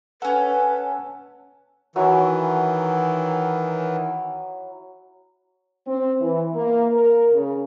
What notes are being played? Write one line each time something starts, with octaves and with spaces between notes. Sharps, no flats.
C#4 A4 B4 F#5 G#5
D#3 E3 F#3 E4 G#5
C4
E3
A#3
A#4
C#3